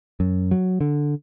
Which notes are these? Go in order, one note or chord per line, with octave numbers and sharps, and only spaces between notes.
F#2
F#3
D3